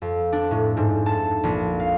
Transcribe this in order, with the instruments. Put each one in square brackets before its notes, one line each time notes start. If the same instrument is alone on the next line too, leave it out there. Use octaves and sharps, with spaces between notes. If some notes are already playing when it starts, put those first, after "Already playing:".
[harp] F2
D4
A2
G#2
A5
A#1
F5